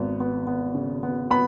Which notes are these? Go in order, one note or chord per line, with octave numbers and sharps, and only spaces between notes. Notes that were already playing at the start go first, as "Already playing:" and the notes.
Already playing: G#1 B3
B3
B3
C#3
B3
B3 B5